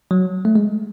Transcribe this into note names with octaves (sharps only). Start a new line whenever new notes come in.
F#3
A3
G#3